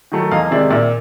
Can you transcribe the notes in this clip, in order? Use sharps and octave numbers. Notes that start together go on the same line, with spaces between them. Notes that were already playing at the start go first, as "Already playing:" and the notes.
D#3 F#3 A3
E2 D#5 F5
C3 D#3 G#3 D5 E5
A#2 D5 E5